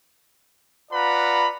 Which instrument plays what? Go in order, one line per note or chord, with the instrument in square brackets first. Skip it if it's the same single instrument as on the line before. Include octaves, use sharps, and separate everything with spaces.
[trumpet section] F4 B4 D5 F#5 A#5 B5